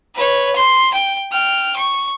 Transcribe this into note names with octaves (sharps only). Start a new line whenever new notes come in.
B4 C#5
C6
G5
G5 F6
C#6